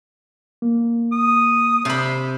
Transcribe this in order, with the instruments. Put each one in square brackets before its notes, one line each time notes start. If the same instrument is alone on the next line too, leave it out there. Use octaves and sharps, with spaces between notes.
[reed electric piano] A#3
[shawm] D#6
[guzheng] C3 B5 [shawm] C5